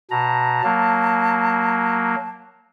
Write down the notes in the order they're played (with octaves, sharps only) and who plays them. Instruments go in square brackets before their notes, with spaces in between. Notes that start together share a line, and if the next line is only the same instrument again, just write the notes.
[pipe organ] B2 A#5 [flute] A5
[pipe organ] F#3 A#3